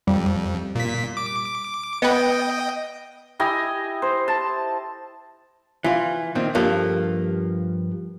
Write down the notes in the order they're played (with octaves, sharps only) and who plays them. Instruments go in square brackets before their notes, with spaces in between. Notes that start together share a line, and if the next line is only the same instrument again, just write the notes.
[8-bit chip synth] F2 [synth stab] G3
[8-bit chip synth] A#2 B6
D6
[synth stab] B3 B4 [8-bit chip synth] D#5 G5
[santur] E4 G4 D#5 G#5
C5
A5
[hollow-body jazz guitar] E3 F4
A#2 D#3 C4
G2 F3 A#3 A4